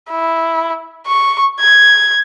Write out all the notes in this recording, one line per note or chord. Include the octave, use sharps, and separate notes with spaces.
E4
C#6
G#6